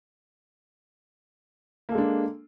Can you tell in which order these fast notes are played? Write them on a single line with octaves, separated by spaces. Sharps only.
A#3 A4 G#3 D4